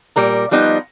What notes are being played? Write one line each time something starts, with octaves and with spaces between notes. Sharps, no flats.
A#2 G3 A#4 A#5
F3 G3 B3 D#4 F4